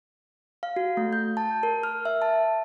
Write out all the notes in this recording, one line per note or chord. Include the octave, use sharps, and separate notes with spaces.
F5
F#4
A3
G6
A5
A#4
F6
E5
A5